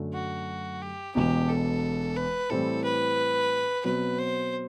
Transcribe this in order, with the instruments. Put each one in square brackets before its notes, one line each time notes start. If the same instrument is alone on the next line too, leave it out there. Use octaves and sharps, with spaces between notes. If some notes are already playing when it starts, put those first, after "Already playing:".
Already playing: [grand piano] F#2 D3 F#3 A3
[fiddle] F#4
G4
[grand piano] E1 E2 B2 [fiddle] G4
[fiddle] A4
B4
[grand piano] A2 E3 G3 C4 E4 [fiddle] A4
[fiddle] B4
[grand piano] B2 F#3 C4 [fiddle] B4
[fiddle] C5